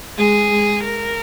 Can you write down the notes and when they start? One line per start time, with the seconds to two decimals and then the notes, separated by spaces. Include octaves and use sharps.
0.18 G#3 G#4
0.51 G#3
0.84 A#4